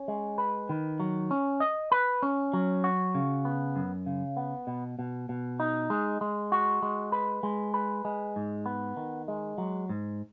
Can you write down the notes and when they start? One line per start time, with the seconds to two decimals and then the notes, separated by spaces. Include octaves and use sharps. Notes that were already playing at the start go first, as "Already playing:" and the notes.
Already playing: C#4
0.08 G#3
0.38 B4
0.69 D#3
1.00 F#3
1.31 C#4
1.60 D#5
1.92 B4
2.23 C#4
2.53 F#3
2.84 F#4
3.15 C#3
3.45 B3
3.76 F#2
4.06 C#3
4.37 B3
4.67 B2
4.99 B2
5.29 B2
5.60 D#4
5.90 G#3
6.21 G#3
6.52 F#4
6.82 G#3
7.12 B4
7.43 G#3
7.74 B4
8.05 G#3
8.36 G#2
8.66 B3
8.97 D#3
9.28 G#3
9.58 F#3
9.89 G#2